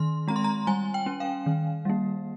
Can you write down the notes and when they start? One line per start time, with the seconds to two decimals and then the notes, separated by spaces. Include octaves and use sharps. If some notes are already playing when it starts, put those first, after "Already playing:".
Already playing: D#3 C6
0.28 G#3 C4 A#5
0.36 C6
0.44 A#5
0.67 G3 G#5
0.94 G5
1.06 C#4
1.20 F5
1.46 D#3
1.85 G3 A#3